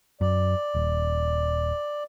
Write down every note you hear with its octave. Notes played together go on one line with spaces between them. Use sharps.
F#2 D5
D#1